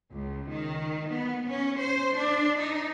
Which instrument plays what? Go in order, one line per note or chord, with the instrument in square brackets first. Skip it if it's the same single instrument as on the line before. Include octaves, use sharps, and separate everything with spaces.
[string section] C#2
D#3
B3
C#4
C5
D4
D#4